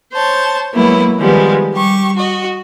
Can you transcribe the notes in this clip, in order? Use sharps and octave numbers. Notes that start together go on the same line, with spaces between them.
C5 C#5 A5
F#3 G#3 A#3 B3 E4
D#3 F3 G3 G#3 B3
G3 G4 C#6
F#4 D#5